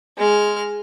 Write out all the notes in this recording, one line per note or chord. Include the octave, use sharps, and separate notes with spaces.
G#3 F6